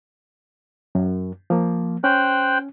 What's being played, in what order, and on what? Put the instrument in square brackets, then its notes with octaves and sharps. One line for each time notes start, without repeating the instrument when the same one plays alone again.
[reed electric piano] F#2
F3 A#3
[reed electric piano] C#4 [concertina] C5 G5 F#6